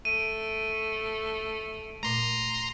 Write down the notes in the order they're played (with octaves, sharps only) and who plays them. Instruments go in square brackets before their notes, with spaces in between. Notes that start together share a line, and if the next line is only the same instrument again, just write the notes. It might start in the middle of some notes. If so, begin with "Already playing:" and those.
[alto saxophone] A3 [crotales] D7 D#7
[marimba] A#2 A3 [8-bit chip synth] A#5 C6